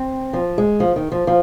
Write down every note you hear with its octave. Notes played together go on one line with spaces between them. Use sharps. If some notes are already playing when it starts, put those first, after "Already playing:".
Already playing: C4
F3
G#3
F3
D#3
F3
F3